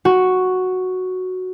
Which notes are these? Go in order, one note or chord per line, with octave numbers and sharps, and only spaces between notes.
F#4